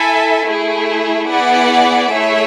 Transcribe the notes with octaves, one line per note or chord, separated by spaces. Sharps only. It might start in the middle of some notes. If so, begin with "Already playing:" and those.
Already playing: E4 A4 E5 G#5
A3 E4 G#4
B3 E4 G#4 D5 F#5
A3 E4 G#4 C#5 E5